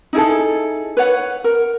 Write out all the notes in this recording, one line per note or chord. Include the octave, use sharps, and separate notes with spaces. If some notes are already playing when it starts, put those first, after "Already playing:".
D#4 E4 G#4 A4
B4 C#5 F#5
A#4